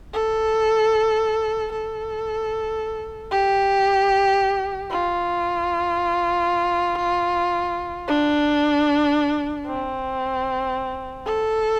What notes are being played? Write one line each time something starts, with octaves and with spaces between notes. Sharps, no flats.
A4
A4
G4
F4
D4
C4
A4